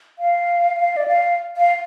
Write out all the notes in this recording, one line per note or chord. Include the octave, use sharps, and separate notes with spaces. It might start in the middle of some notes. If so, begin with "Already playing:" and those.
F5
F5
D5
F5
F5